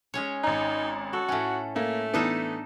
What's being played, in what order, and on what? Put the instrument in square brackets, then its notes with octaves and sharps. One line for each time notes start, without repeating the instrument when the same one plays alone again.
[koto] G#3 C#4 C#5
[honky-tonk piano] G#1 A#5 [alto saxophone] D#4
[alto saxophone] F#4 [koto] A4
[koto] A2 C#4 [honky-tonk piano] F#5
[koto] A2 [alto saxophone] A3 [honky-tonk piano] A#3
[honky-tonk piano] E3 B3 [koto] D4 D#4 A4